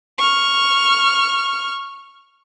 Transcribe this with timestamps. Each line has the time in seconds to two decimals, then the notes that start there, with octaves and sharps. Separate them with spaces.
0.18 C#6 F6